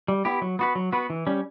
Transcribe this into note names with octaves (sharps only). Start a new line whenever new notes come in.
G3
B3 E4 G4
F#3
B3 F#4 B4
F#3
B3 F#4 B4
E3
G3 C#4